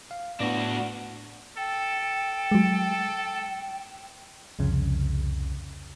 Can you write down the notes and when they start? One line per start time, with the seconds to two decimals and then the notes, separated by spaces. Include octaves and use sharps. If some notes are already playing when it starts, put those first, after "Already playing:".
0.11 F5
0.40 A2 B3 D4 F#4 A#6
1.58 A4 G5
2.51 F#3 G#3
4.59 C2 F2 C#3